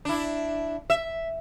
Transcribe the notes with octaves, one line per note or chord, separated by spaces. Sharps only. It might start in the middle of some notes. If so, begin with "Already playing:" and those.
D4 E4
E5